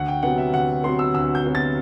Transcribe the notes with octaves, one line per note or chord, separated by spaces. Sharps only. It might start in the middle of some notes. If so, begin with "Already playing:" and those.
Already playing: D2 F#5
G5
C3 F#3 B3 F#5
E5
D2 F#5
C3 F#3 B3 C6
E6
D2 E6
G6
C3 F#3 B3
A6